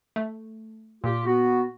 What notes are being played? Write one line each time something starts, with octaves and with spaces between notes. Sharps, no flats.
A3
A#2 F4 G4
B3 F#4